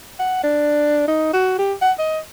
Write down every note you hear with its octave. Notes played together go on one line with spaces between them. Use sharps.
F#5
D4
D#4
F#4
G4
F#5
D#5